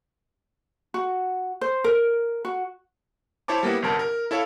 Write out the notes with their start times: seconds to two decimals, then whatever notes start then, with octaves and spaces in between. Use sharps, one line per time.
0.94 F#4
1.61 C5
1.84 A#4
2.45 F#4
3.48 E4 C5 C#5 A5 D6
3.63 G3 A#3 B3 E4
3.82 G1 C2 A#4 A5
3.99 A#4
4.31 E4 A4 C#5 F5